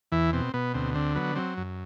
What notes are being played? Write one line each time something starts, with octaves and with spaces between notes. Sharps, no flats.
E2 E3 E4
B2 C4
B2 B3
D2 C4
D3 C4
F#3 B3
F#3 C4
F#2